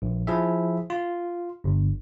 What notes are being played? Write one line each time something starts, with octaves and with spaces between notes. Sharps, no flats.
A#1
F3 E4 G#4 E5
F4
G1